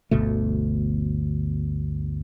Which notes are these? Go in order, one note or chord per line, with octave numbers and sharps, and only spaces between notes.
G1 D2 B2 A3